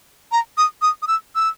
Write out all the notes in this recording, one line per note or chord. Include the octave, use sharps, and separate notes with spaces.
A#5
D#6
D#6
D#6
E6
E6